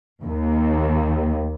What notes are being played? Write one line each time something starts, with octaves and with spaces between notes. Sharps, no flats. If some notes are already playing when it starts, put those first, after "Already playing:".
D#2